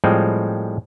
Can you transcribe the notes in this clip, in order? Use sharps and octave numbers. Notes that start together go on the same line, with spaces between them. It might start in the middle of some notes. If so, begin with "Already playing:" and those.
A2 F3 G3 G#3 C4